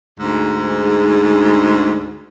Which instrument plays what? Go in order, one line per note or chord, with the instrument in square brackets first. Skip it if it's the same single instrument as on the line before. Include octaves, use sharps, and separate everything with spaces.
[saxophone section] D2 G#2